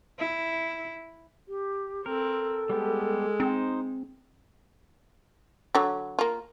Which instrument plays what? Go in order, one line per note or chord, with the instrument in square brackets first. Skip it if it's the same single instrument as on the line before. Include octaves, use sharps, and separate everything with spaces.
[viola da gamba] E4
[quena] G4
[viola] C4 [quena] A4 [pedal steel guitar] A#4
[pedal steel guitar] G3 B3 G4 [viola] G#3
[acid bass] C4 [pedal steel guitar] D#4 C5
[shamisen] D3 F#3
A#3 F4